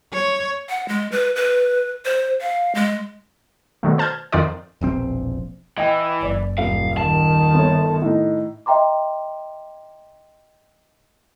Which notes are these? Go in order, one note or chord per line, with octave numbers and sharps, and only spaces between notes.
C#5
F#5
G#3
B4
B4
C5
F5
G#3
B2 D3 D#3 A3
C5 A5 F6 G6 G#6
F2 D#3 D#4 F4 C5 D5
E1 A#1 C4
E3 D#5 G5
F#1 D5
D#1 F5
D#3 A5
G1 C#5
A2 D#4
D#5 E5 G5 A#5 C6 D6